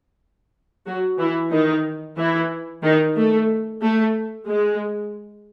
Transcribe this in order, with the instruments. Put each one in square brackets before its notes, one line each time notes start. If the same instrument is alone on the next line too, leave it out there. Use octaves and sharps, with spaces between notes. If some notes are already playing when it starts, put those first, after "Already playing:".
[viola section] F#3 F#4
E3 E4
D#3 D#4
E3 E4
D#3 D#4
A3
A3
G#3